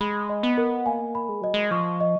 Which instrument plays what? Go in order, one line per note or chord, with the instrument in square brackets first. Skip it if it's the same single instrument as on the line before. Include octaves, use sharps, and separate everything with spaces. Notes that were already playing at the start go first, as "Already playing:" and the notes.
[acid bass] G#3 [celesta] B5
[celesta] D#5
[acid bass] B3
[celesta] A#4
[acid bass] A#3 [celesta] G#5
[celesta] B5
[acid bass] G#3
[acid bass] F#3 [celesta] D#5
[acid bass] G#3
[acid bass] F3 [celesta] C#6
[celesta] D#5